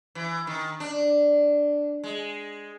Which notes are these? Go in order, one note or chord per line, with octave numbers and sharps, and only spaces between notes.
E3
D#3
D4
G#3